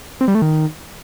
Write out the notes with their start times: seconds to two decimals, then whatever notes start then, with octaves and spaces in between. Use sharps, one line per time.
0.21 C4
0.28 G3
0.35 A3
0.42 D#3